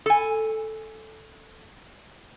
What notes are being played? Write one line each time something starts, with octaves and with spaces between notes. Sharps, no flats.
A4 G#5